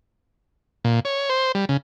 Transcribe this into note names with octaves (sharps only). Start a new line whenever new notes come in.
A#2
C#5
C5
G3
C#3